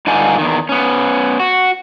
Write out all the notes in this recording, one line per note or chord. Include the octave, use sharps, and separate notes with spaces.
G2 D3 D#4 F4 G#5
E2 D#3
B3 C#4
F#4